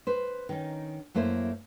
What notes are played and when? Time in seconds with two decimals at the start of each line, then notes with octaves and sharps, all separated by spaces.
0.07 B4 C5
0.49 D#3 C#4 D#4
1.15 F#2 A3 A#3 E4 C5